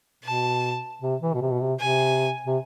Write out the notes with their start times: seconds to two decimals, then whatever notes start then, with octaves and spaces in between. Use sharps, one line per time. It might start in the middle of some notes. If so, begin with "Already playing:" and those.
0.24 B2 A5
1.02 C3
1.22 E3
1.34 B2
1.41 C3
1.51 B2
1.60 C3
1.80 C3 G#5
2.47 C3